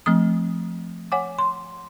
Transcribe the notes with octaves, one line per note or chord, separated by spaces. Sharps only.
F3 A3 C4 D#6
C#5 F#5 G#5 D6
C6